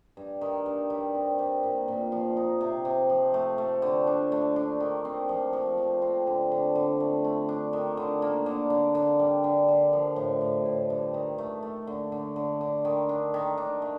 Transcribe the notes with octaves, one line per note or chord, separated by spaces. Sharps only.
G2
D#3
G2
G3
C4
G3
A#2
A#2
F3
D#4
C3
C3
F3
A3
A3
D3
D4
A3
D4
D#3
C4
F3
F3
F3
C4
D3
D3
D3
A3
A3
D4
D#3
D3
A#3
D3
D3
D3
G3
D3
D3
F3
A2
A2
A2
G2
D#3
A3
A3
D3
D3
D3
D3
D#3
D4
D#3
D4
A3